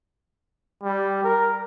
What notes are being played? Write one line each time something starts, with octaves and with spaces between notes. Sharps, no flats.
G3
A#4